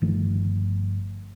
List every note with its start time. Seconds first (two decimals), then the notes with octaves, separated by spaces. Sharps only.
0.02 G1 D#3 F3 A3